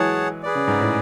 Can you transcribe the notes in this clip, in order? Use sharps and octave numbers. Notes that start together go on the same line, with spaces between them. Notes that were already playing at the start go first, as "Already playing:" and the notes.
Already playing: E3 F#3 G#3 G#4 C#5 F#5 A5
G#4 B4 D5
C#3
G#2
A2